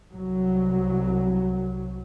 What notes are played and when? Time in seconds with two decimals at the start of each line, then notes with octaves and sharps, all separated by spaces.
0.13 C2 F#3